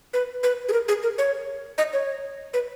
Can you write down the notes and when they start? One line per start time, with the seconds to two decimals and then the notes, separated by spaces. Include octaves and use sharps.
0.13 B4
0.43 B4
0.68 G#4
0.73 A#4
0.88 G#4
1.03 A#4
1.18 C#5
1.78 D#5
1.93 C#5
2.54 B4